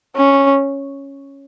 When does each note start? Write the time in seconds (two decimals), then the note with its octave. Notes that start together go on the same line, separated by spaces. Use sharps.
0.16 C#4